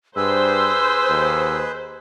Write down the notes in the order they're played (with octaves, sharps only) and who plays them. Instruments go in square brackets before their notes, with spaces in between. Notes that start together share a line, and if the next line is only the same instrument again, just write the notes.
[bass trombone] G2 [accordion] G#4 B4 [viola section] C5 [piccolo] E6
[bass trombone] D#2